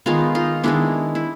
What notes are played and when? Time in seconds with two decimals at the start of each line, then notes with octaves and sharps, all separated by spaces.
0.06 D#3 G#3 B3 D#4 F4
0.35 D#4 F4
0.63 D#3 G#3 B3 D4 E4
1.15 E4